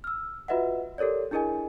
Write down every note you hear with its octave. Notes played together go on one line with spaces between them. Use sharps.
E6 F6
F4 F#4 B4 D#5 E5 F#5
G4 A4 A#4 C#5 D5
D4 E4 G#4 A#4 D#5 G#5